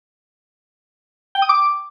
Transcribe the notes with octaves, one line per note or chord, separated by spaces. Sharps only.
G5
D#6
D6